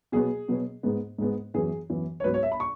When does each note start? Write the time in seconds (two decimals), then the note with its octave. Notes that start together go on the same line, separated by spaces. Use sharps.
0.12 B2 F#3 B3 G#4
0.48 B2 F#3 B3
0.83 G#2 G#3 B3
1.18 G#2 G#3 B3
1.54 F#2 E3 B3 G#4
1.90 F#2 E3 B3
2.20 C#5
2.24 G#2 F#3 B3 B4
2.34 C#5
2.43 E5
2.52 B5
2.60 C#6